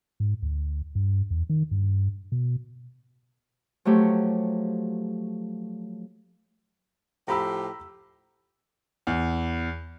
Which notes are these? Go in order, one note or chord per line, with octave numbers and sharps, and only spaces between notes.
G#2
D2
G2
E2
D#3
G2
B2
F3 F#3 A3 G4 C#5
A2 F3 G4 A#5 B5 E6
E2